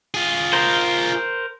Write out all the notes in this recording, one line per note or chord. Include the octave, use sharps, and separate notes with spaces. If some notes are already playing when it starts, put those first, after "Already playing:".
F4 G#4
A#4 C5